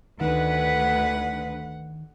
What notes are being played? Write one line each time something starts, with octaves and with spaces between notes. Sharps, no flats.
D2 D#3 B4 F#5